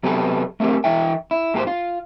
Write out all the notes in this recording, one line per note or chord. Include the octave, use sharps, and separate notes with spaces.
C3 F#3 B3 G4 A4 B4
A3 A#3 C4 G4 A#4
E3 E4 E5 G5
E4
G#2 A#3 G4 A#4 C5
F4